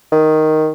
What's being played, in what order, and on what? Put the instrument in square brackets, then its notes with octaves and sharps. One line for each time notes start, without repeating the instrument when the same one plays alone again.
[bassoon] D#3